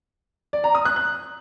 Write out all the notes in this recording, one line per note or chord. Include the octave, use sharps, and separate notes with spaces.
D5
A#5
D#6
F#6
F#6